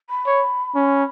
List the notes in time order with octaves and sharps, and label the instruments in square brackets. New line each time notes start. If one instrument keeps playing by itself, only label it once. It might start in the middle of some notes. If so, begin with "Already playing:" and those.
[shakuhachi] B5
[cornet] C#5
C#4